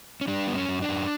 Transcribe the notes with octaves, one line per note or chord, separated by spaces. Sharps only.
C#4
G3 D4
F#2 B3
C#4
F#2
D4
F#2